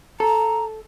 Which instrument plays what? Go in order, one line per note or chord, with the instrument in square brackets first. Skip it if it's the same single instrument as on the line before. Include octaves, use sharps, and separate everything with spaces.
[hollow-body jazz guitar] A4 [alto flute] A#5